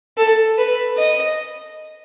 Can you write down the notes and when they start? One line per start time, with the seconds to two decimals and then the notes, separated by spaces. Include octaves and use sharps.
0.18 A4
0.58 B4
0.98 D#5